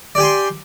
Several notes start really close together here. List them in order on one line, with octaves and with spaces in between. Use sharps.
D5 G4 G#5 C6